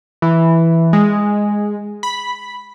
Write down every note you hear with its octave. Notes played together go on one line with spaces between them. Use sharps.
E3
G#3
B5